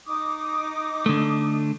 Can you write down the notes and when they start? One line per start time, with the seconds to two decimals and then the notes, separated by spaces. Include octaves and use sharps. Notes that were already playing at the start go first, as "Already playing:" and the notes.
0.06 D#4 D6 D#6
1.06 D3 A3